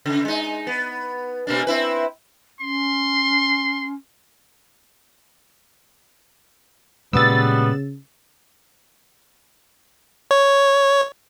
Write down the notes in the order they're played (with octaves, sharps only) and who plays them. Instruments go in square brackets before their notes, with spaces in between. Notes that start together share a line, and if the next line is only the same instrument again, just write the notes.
[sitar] C#3
G#3 D#4
B3
B2 A#3 D4
C4 E4 B4
[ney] C#4 [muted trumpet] C6
[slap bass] A#2 G#3 [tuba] C#3 [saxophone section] G3 B3 [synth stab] E6 A6
[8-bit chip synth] C#5